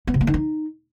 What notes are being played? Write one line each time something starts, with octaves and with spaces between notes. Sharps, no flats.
B3
C3
A#3
D#3
D#4